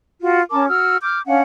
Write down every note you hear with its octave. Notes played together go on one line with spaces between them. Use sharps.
F4 F#4
C#4 A#4 A5 D6
F#4 E6 F6
D6 F6 G6
C#4 D4 F5 F#5